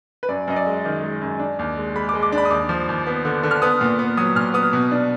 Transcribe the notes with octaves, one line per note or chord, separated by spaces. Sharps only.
B4
F#2 D5
F#2 D#5
D5
G#3
D#3
G#3
F#2
D4
D#2
G#3
G#3 B5
D6
G#3
D6
D4
B5
D#6
D#2 D6
F3
D#2
B3
D3
D3
F6
B3 D#6
A#2
B3
F#3 D#6
A#2 F6
B3 D#6
B2
D4